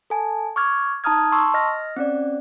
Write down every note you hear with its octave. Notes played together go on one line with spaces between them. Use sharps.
A4 G#5 A5
C#6 D6 F6 G#6
D#4 A5 A#5 D#6 F6 G#6
A5 C6 C#6 E6
D#5 F6 A#6
C4 C#4 D5